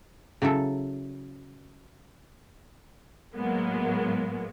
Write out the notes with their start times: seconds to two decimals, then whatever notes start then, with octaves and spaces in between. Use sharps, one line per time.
0.42 C#3 F#3 E4 A4
3.35 A2 F#3 G#3 A#3 B3